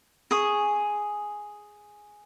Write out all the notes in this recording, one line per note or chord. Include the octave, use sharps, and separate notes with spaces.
G#4 C#6 D#6